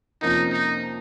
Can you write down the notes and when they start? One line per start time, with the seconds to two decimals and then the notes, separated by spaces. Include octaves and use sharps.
0.22 F2 C3 F3 A#3 C#4 D#4
0.52 D#4